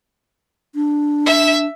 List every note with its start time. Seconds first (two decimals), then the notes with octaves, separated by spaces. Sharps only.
0.75 D4
1.26 E5